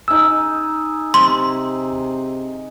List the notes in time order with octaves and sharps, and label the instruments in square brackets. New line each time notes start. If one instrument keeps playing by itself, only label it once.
[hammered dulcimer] D#4 G#4 [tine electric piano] E6
[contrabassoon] C3 [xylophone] C6